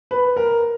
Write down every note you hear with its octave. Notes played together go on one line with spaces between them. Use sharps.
B4
A#4